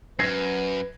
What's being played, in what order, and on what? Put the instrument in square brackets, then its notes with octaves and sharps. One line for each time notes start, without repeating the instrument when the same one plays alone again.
[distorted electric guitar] F#2 [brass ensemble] B4 [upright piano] G#6 A#6 C7